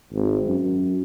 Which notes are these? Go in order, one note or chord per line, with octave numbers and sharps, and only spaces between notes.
G#1
F#2